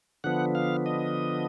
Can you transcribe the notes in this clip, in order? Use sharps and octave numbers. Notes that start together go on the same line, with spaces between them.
D3 F3 B3 F#5
F5
D#5